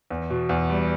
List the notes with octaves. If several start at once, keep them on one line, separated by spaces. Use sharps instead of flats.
E2
B2
E2
G3